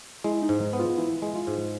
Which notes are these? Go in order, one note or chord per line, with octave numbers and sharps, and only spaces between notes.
G#3 E4
D#4
G#2
D#4
B3
F4
E3 E4
G#3
F4
G#2